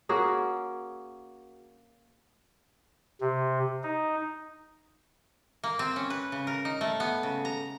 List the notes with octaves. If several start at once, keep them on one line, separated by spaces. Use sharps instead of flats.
A#3 C#4 F#4 G#4
C3
D#4
A#3
C4
C#4
B4
C#3
A#4
D#4
A3
B3
C#3
A#5